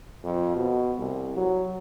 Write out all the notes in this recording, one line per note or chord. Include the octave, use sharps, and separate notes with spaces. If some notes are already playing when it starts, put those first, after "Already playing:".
F2
B2
C2
F#3